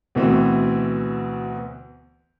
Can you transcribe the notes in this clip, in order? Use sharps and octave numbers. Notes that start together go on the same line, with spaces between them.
D2 B2 E3 B3 C4